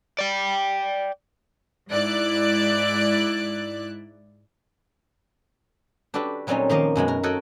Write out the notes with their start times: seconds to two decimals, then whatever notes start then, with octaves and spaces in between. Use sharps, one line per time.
0.19 D5 G5
1.91 G#2 E4 D5 F#6
6.14 D4 F#4 G4 A4 B4
6.47 A#2 F#3 G3 C4 C#4 D#4
6.69 D#3 F3 A#3 D#5 F5
6.95 F#2 B2 G#3 F#4
7.08 A#4
7.23 F#4 A4 C#5 D#5 F#5 G5